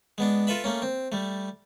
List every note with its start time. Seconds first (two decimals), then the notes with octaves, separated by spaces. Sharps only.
0.18 G#3 B3 D4
0.47 F4 A4 B4 E5 B5
0.64 A3 A#3 C#4
0.82 C4
1.12 G3 A3